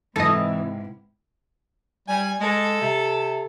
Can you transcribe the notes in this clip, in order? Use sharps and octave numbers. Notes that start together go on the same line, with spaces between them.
G#2 C3 E3 G#3 E4 A4 D#5
G3 G#5
G#3 A4
C3